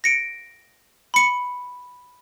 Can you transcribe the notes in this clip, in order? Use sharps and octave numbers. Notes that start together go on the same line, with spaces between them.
A#6 C#7 D7
B5 C#7